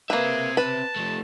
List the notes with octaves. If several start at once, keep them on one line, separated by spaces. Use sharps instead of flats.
A#3 C4 G#4 B4 E5
B4 A5
F3 A3